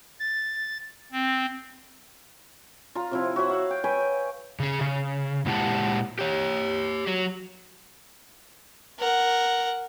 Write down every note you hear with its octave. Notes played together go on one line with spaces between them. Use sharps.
A6
C4
F4 A#5
C3 F3 E4
F#4 C#5 E5 F#5
F5 F#5
G5
B4 C#5 G5 G#5
C#3 G#4
C#3
A#2 G#3 E4 G4 F#5 A5
G4 C#5
F#3
A#4 F#5